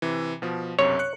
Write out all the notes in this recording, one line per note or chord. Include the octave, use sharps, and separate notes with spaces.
C3 E3
B2 F3
B1 F#2 C3 C#5
F#6 C#7